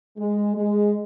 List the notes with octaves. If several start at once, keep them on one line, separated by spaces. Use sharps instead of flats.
G#3
G#3